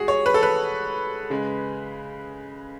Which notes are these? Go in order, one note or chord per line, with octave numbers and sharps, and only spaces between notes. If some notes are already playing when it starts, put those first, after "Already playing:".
Already playing: G#3 F#4 G#4
C#5
B4
A4
B4
C#3 G#3